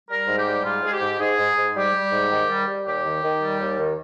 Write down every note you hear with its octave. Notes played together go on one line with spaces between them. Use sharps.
G3 A#4
G#2
G4
G3
G#2 F4
G#2 G#4
G4
G#2
G#2 G#4
G#2
G#2
G3 G4
G3
G#2
D#3
G3
G3
D#2 G4
D#3
D#3
G3
D#2
D#3